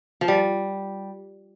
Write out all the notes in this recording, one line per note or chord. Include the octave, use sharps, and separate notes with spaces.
F3
G3